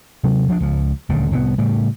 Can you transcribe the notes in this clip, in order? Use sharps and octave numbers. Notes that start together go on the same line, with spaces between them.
C3 F#3
D2 F3 A3 D4
C#2 F3
D#1 D2 A#2 C#3
C2 A2 E3 B3
A2 C#3 G3